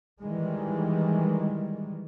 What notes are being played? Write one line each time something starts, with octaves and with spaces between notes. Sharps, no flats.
D#3 E3 G3 G#3